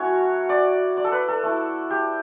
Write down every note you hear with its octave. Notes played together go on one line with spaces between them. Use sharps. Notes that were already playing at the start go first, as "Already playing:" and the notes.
Already playing: F#3 A3 C#4 E4 F#4 C#5
D5
D5
A4
B4
A4
A3 E4
G4